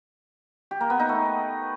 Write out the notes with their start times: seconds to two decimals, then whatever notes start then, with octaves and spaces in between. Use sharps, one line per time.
0.71 G4
0.80 A#3
0.90 B3
0.99 D#4
1.09 A3